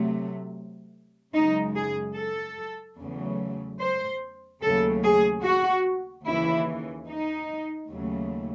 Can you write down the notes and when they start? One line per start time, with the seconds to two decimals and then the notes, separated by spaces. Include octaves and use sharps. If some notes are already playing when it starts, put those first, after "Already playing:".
Already playing: C3 F#3 A3
1.34 F#2 C#3 G#3 D#4
1.75 G#4
2.16 A4
2.98 E2 C#3 F#3 A3
3.80 C5
4.62 D#2 C#3 F#3 A3 A4
5.03 G#4
5.44 F#4
6.25 D#2 C#3 E3 E4
7.07 D#4
7.90 D#2 C#3 F#3 A3